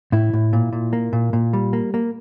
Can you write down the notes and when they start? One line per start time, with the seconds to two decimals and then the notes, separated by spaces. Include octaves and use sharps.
0.12 A2 E4
0.33 A2
0.53 A#2
0.73 A#2
0.93 A#3
1.13 A#2
1.33 A#2
1.53 G3
1.73 A#3
1.94 A#3